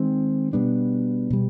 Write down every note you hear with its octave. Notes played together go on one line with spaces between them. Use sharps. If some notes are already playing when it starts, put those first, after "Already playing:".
Already playing: D#3 G#3 C4
B2 G3 B3 D4
B2 G3